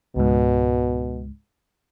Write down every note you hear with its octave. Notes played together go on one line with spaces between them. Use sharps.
C#2 G#2 B2